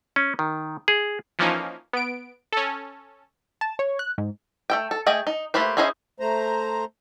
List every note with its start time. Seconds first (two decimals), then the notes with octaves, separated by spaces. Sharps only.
0.16 C#4
0.39 D#3
0.88 G#4
1.39 E3 F3 A#3 C#4 D#4
1.93 B3 D7
2.52 C#4 A4
3.61 A5
3.79 C#5
3.99 F#6
4.18 G#2
4.70 A3 A4 G5
4.91 A4
5.06 A3 G#4 D#5 G5
5.27 D#4
5.54 A3 A#3 G4 B4 C5
5.77 C#4 E4 G#4 C5 D#5
6.20 A3 C5 A#5